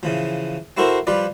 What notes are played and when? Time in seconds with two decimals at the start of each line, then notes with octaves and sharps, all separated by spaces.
0.03 C#3 E3 F3
0.77 C4 E4 F#4 A4 A#4 C5
1.07 F3 G3 F4 B4 D5